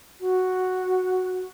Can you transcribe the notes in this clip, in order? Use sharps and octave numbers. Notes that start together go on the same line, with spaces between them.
F#4